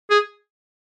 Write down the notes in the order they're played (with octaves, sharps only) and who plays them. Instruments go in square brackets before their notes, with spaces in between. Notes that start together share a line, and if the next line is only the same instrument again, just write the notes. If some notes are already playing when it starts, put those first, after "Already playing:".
[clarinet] G#4